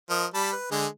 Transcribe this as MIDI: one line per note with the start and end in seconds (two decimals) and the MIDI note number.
0.10 0.26 53
0.10 0.26 70
0.10 0.26 75
0.34 0.52 55
0.34 0.52 81
0.34 0.52 83
0.52 0.69 71
0.71 0.86 50
0.71 0.86 56
0.71 0.86 68